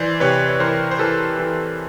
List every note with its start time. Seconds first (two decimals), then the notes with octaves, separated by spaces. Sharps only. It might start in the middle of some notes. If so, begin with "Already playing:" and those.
Already playing: E3 C5 D5
0.20 C3 B4 C#5
0.49 C#5
0.60 E3 A#4 C5
0.91 C5
0.99 E3 A4 B4
1.39 E3